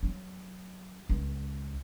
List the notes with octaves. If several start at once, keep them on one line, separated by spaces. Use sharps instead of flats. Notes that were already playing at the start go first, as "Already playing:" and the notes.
F#3
C#2